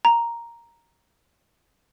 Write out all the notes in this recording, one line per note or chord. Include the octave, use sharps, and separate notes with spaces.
A#5